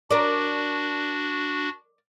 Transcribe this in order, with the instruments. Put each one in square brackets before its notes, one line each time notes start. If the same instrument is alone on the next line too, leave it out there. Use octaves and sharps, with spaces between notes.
[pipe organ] D4 F#4 [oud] A#4 D5